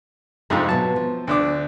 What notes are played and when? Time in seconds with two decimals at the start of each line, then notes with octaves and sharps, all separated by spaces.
0.50 F2 G#2 C3 A3 F4
0.69 B2 F#3 A5
0.96 F3
1.27 D2 D4 D6